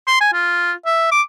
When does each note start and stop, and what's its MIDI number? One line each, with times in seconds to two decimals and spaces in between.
0.07 0.19 84
0.21 0.29 80
0.33 0.72 65
0.86 1.09 76
1.12 1.22 86